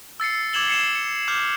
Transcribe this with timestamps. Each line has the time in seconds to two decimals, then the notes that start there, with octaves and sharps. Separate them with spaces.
0.20 E6 A6 C7 C#7
0.53 D6 E6 G#6 E7 F#7 G7
0.68 C7 C#7 E7
0.95 C#7
1.28 D6 F6 G6 E7